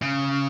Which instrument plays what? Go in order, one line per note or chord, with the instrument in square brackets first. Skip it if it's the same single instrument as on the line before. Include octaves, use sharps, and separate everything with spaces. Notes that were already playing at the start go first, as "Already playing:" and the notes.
[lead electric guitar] C#3